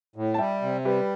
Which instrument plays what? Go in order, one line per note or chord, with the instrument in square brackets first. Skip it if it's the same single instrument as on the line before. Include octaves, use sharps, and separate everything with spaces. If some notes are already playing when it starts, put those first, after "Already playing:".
[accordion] A2
[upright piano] A5
[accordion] G3 [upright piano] E5 G5
[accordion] C3
[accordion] G3 [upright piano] G4 B4